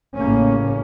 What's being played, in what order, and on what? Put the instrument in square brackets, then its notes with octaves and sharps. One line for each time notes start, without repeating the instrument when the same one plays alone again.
[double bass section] A1 A2 C#3 A#3 C#4